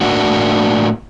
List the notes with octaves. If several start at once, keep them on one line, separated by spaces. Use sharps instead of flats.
A2 A#3 D4 F#4